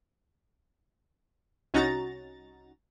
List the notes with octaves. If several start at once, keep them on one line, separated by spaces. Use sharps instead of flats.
C2 C#4 D#4 F#4 A#5 A6